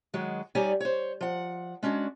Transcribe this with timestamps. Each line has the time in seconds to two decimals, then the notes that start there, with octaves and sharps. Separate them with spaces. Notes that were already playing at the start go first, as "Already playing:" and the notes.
0.14 D#3 F#3 G#3 F#4
0.55 G3 D#4 G4 C#5 D5 G#5
0.80 C5 C#5
1.21 F3 F#5
1.83 G#3 C#4 D4 F#4